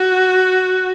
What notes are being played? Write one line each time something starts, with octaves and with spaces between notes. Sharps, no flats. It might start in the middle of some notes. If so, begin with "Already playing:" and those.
Already playing: F#4